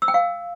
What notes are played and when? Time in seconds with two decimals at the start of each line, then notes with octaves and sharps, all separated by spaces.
0.02 E6
0.08 G5
0.14 F5